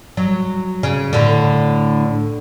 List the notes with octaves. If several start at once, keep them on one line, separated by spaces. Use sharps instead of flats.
F#3
C#3
A2 D3